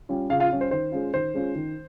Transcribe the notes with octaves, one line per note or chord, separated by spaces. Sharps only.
G3 C#4 F4
C#3 F4 F5
F4 F5
G3 C#4 F4
C5
D#3 C5
G#3 C#4 F4
D#3 C5
G#3 C#4 F4
D#3